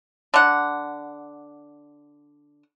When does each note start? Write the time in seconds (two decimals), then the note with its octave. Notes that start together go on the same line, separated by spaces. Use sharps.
0.34 D3 F#5